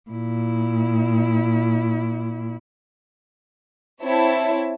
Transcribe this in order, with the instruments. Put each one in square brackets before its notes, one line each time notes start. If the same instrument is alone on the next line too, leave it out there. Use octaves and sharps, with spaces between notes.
[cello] A#2 E4
[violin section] C4 E4 C#5 E5 A5